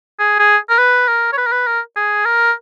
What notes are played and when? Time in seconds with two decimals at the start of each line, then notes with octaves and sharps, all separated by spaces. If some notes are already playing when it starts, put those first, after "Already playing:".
0.19 G#4
0.39 G#4
0.69 A#4
0.78 B4
1.08 A#4
1.33 C#5
1.37 B4
1.46 A#4
1.52 B4
1.67 A#4
1.96 G#4
2.25 A#4